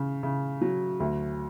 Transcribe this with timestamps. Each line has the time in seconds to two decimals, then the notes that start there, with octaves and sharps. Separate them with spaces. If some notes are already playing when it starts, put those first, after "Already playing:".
Already playing: C#3
0.23 C#3
0.61 F#3
1.00 D2